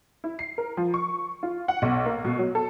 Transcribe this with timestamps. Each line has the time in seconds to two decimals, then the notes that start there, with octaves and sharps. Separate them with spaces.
0.24 E4
0.39 C7
0.58 A#4
0.77 F3
0.94 C#6
1.43 F4
1.68 F#5
1.82 B1
2.06 A#3
2.24 B2
2.39 F#3
2.55 A4